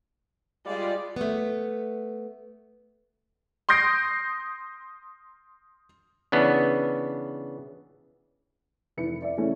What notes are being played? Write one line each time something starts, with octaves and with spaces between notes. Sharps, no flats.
G3 G#3 F4 D5
A3 B3
C6 D#6 G6 A#6 C7 D7
C#3 E3 B3 D4
F1 E3 E4 B4 C#7
D5 E5
C#3 E3 A3 C#4